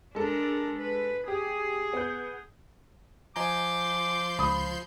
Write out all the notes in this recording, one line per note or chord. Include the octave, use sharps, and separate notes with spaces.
G#3 D4 A4 A#4
B4
G4 G#4
B3 G6
F3 D#5 G#5 A#5 C6 D6 G6
C#2 B5 D#6